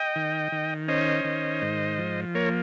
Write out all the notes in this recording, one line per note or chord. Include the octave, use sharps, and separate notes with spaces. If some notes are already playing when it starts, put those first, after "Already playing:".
Already playing: D#5 G5
D#3
D#3
C#4 C5 D#5
D#3
G#2
F3
A#3 A#4 C#5